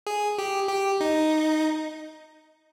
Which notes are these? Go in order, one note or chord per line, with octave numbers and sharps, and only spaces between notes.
G#4
G4
G4
D#4